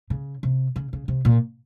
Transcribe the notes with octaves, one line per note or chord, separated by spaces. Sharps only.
C#3
C3
C#3
C#3
C3
A#2